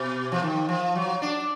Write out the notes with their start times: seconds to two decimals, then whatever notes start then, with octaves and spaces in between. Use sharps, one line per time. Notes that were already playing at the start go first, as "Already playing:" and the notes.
Already playing: B2
0.32 F3
0.43 D#3
0.69 F3
0.96 F#3
1.22 D4